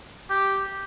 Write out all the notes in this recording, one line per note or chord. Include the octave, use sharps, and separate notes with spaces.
G4